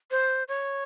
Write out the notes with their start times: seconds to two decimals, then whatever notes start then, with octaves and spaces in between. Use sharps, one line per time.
0.11 C5
0.48 C#5